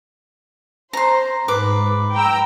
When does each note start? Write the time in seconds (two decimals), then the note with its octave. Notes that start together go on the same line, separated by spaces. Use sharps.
0.93 C5 A#5 C6
1.48 G#2 B4 D6
2.14 G5 A#5 E6